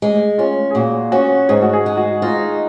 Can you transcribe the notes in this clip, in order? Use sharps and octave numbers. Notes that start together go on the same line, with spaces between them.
G#3
C#4 F4
G#4
A#2 F#4
C#4 F#4
G#2 G#4
F#4
G#4
G#3
F#4
D#4 F4